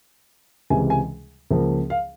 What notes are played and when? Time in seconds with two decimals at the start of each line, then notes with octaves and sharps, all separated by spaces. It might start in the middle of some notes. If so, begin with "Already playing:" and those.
0.70 C#2 C3 E3 G#3 G#5
0.90 G#5
1.51 C#2 C#3 F3 A#3
1.90 F5